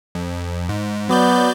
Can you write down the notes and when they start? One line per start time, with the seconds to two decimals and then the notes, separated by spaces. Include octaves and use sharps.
0.15 F2
0.69 G#2
1.09 F#3 B3 D5 G6